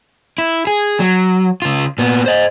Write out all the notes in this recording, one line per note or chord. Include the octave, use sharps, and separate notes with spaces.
E4
G#4
F#3
C#3 F4
A#2 B3
C5 D#5